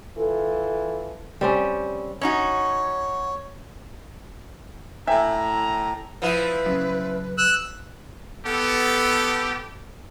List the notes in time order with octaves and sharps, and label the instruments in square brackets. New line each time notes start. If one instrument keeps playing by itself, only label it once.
[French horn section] E3 F4 A4
[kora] G3 C4 C#4
[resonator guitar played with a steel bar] C#4 D#4 F#4 [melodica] C#5
[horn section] A2 A#5 [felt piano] E5 G5 G#5
[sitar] F3 C4 E4 [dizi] B4
[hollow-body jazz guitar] F#2 C#3
[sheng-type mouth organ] E6 F#6
[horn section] B3 A4 [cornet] G4